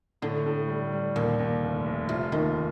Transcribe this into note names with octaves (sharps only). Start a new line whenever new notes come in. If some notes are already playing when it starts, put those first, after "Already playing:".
A2 D3
A2
G3
G3
D#2 A#2
D#2
F1
F1
C3 F4
D#2 D#3